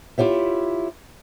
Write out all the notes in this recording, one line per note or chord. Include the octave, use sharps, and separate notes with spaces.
E4 F4 G4 C#5 E5